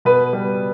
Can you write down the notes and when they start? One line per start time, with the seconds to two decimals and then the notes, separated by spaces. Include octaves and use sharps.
0.05 B2 B4
0.33 G3